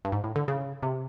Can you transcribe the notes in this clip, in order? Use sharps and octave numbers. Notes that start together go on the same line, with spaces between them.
G2
G#2
A2
D3
C#3
C3